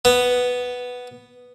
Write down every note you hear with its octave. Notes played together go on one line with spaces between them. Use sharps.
B3